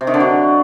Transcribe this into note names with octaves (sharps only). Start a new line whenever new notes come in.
C3
D#3
D3
F#3